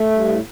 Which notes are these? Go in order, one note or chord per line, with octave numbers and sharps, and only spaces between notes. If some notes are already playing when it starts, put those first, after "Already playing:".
Already playing: A3
G2
A2